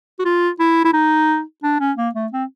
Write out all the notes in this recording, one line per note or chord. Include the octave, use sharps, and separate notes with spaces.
F#4
F4
E4
E4
D#4
D4
C#4
A#3
A3
C4